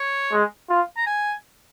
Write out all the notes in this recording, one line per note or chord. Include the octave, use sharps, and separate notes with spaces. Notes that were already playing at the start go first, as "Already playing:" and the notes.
Already playing: C#5
G#3
F4
A#5
G#5